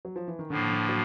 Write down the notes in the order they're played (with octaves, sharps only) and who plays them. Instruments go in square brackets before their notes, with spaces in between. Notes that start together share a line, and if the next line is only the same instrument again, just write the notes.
[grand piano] F#3
F3
E3
D#3
[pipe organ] A2 F3 A#3 [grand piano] D3
[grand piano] D3
F#3